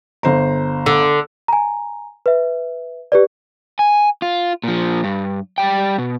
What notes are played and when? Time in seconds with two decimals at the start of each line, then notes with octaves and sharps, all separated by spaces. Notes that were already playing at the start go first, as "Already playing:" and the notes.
0.23 G1 C5 A#5
0.86 D3
1.48 G#5 A#5
2.26 B4 E5
3.12 G4 B4 D5
3.79 G#5
4.22 F4
4.64 A#2 F3
5.04 G2
5.58 G3 G5
5.98 B2